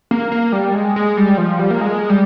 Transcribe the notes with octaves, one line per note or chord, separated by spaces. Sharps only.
A#3
A#3
G3
G#3
G#3
G3
F3
G3
A#3
G#3
G3